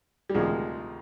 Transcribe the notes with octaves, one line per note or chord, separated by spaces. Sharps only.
G3
D2 C3 D#3 F3 G#3